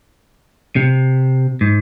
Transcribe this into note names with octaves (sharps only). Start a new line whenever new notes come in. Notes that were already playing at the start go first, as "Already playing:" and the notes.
C3
G#2